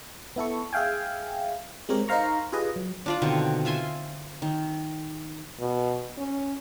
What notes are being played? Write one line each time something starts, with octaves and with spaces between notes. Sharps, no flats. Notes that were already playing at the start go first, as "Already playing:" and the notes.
B3 E4 A4 C#6
G#4 E5 F5 G5 G#5
G#3 C4 G4 A#4 C#5
D#4 A#4 C5 F5 A#5 C#6
F4 G4 G#4 B4 D#5
F#3
D4 F4 D5
B2 D3 D#3 C4
F4 E5 G#5 C6
D#3
B2
C#4